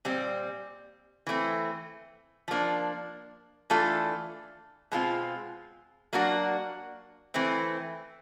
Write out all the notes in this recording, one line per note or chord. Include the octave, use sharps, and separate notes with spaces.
A#2 G3 C4
E3 A3 C4
F3 A#3 D4
E3 A3 D4 F4 A4
B2 G#3 C4 F4
F#3 A#3 D4 F#4
E3 A3 C4